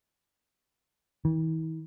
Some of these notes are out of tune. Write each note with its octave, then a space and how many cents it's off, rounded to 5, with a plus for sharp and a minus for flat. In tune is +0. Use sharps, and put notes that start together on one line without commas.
E3 -45